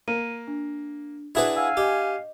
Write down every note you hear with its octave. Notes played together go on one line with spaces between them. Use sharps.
A#3 D#7
D4
D4 E4 F#4 G#4 B4 E5
F5 F#5 G#5 E6
G4 D#5